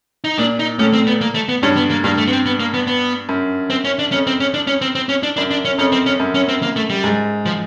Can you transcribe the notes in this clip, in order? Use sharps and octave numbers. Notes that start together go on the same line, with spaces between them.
D#4
A#2 D4
D#4
A2 C#4
C4
B3
A#3
A3
B3
G2 C#4
B3
A#3
G2 A#3
A3
B3
C4
B3
A#3
B3
B3
F#2
C4
C#4
D4
F2 C#4
C4
C#4
D4
C#4
C4
C4
C#4
D4
F#2 D4
D4
C#4
F2 C#4
C4
C#4
F#2
C#4
C4
A#3
A3
G3
G#2
F3